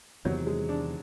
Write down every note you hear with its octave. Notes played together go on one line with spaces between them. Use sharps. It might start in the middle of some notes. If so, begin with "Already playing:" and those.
E2 C3 D#3 F#3
G#3
D4